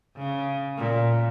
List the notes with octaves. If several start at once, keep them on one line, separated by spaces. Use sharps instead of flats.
C#3
A#2